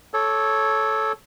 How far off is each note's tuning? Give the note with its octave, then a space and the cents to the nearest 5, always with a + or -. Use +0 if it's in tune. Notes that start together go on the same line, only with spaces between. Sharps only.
A4 -10 C#5 +0 D6 +20